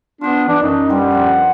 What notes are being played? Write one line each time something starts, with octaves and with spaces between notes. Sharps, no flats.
B3 D4 F4 C5
E3 D4
F#2 C#4 D#4
G3 B3 C4 D4
F3 E5 F#5